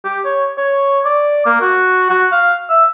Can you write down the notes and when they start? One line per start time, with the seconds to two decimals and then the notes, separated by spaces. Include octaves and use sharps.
0.04 G4
0.26 C#5
0.58 C#5
1.05 D5
1.46 A#3
1.61 F#4
2.10 F#4
2.32 F5
2.70 E5